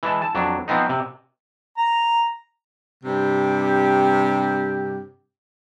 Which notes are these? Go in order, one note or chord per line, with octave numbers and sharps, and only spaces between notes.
E3 G#3 A5
A5
F2 F#3 D4
F3 B3 C4 D#4
C3
A#5
G2 C3 G4